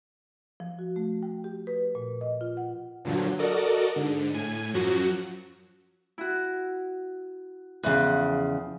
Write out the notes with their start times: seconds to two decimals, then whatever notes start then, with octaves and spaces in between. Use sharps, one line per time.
0.60 F3
0.79 F#4
0.96 A3
1.23 G5
1.44 G4
1.67 B4
1.95 A#2
2.21 D#5
2.41 F4
2.57 F#5
3.05 G2 A#2 D3 F3 F#3
3.39 F#4 A4 A#4 D5 D#5
3.96 G#2 D3
4.34 A2 G#5
4.74 F#2 F3 F#3 F#4
6.18 E4 F#4
7.83 E2 C#3 F3 F#6